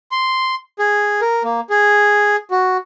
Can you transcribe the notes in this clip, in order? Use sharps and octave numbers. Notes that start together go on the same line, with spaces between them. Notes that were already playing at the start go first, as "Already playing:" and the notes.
C6
G#4
A#4
A#3
G#4
F#4